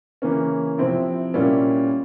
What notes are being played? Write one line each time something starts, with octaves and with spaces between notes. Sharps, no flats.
C#3 E3 A#3 C#4
C3 F3 C4 E4
A#2 G3 C#4 E4